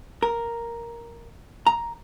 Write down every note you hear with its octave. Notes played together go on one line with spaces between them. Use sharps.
A#4
A#5